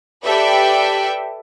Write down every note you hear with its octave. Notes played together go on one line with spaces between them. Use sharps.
G4 A4 B4 D5 E5 G5